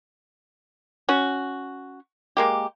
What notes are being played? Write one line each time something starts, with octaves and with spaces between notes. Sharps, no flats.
C#4 F#4
G#3 A#3 G4